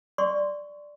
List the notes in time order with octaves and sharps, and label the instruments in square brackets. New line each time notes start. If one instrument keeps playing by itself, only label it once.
[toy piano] D5 C6 C#6